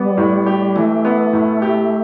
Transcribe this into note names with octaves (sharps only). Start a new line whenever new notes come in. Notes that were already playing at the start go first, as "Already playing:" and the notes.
Already playing: G3 B3
A2
G4
E3 A3
B3
A2
G4